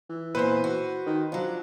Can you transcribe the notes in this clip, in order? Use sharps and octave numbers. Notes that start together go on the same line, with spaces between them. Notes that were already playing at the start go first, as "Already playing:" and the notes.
E3
E2 A#2 B4 C5
F#4
D#3
F3 F#3 D4